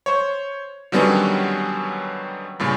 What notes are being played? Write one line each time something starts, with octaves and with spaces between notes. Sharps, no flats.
C5 C#5
D3 D#3 F#3 G3 B3 C#4
G2 A#2 C#3